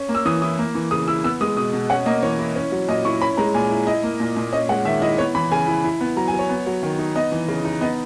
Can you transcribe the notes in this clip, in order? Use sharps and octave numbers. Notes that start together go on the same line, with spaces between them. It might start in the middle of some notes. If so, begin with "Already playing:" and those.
Already playing: C#4
A#3
E6
E3 D#6
E4 D#6
A#3
E3
C#3 D#6
E4 E6
B3 E6
G#3 D#6
B2 D#6
B2
C#4 F#5
A#3 D#5
E3 C#5
E4
C#4
F#3
A#2 D#5
E4 C#6
C#4 B5
G#3 A#5
A#2 G#5
E4
E4 D#5
A#3
A#2
A#2
C#4 D#5
G#3 F#5
D#3 E5
E4 D#5
B3 C#5
E3 B5
C#3 G#5
E4
E4
B3
F#3 A#5
G#5
F#3
C#5
B3
F#3
D#3
D#4
B3 D#5
E3
C#3
D#4
B3 D#5